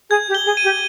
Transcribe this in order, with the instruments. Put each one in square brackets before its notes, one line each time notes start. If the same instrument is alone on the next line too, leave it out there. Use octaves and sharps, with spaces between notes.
[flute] G#4 [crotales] G#6
[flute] G4
[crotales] G7
[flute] G#4
[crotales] D#7
[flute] G4